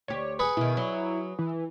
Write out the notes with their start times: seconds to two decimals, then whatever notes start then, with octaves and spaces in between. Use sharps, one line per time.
0.08 D2 G4 C#5
0.39 G#4 B4 C#7
0.57 B2 D#3 E4
0.77 F#3
1.39 E3